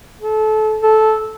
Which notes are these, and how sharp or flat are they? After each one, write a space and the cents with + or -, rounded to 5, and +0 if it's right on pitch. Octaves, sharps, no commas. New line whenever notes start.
A4 -25
A4 -10